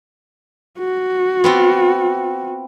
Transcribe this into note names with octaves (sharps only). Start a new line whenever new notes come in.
F#4
B3 C4 F4